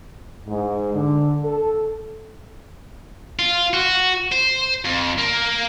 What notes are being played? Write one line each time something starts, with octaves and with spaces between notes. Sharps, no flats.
G#2
D3
A4
F4
F#4
C5
F2
A#3